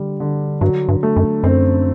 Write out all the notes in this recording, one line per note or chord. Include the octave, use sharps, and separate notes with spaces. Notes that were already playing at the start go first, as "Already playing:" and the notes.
Already playing: D3 G3
D3
G2 F#3
G2
A3
F#2
F#2 C4